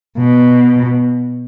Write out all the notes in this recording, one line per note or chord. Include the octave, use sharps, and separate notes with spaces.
B2